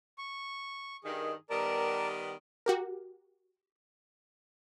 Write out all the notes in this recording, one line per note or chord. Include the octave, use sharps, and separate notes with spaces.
C#6
G2 D#3 G#4
D#3 G3 B3 A#4 D5 A5
F#4 G4 A#4